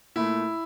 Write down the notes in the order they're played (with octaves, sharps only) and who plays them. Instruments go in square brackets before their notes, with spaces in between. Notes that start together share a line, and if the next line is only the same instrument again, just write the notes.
[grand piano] A#2 A3 E4